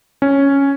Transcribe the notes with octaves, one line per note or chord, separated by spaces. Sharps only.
C#4